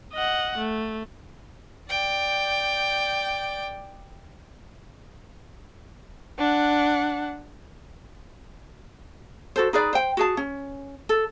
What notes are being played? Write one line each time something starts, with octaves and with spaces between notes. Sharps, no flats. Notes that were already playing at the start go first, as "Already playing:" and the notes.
D#5 F#5
A3
D5 G5
D4 F#5
F#4 A4 C5
D#4 G#4 B4 D5
C5 G5
F#4 G#4 A5
C#4
A4